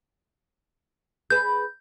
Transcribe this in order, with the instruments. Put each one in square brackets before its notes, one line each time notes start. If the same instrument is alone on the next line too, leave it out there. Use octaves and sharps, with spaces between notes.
[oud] G#4 B4 [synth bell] G6